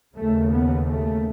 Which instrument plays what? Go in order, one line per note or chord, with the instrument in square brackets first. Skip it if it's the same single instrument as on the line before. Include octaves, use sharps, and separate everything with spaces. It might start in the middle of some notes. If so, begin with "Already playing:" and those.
[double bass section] D#2 C#3 A3
B3
A3